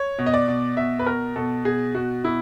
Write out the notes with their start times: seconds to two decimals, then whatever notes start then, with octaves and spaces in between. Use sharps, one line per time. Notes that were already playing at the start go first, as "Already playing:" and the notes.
Already playing: C#5
0.19 B2
0.26 D#5
0.34 D5
0.48 B2
0.77 B2 E5
0.99 B4
1.06 B2 A#4
1.36 B2 A4
1.65 B2 G#4
1.95 B2 F#4
2.24 B2 E4